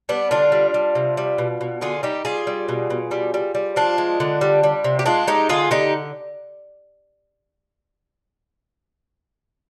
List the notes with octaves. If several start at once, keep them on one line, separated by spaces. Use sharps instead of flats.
G3 B3 D4
D3 D4 F4
G3
G3
C3
G3
B2
B2
D3 F4 G#4
G3 D#4 G4
G3 F4 G#4
G3
B2
B2
G3
G3
G3
F3 D4 F4
G#3
D3
G3
G3
C3
G4
G#3 D4 F4
G#3 D#4 G4
D3 F4 G#4
D3 D#4 G4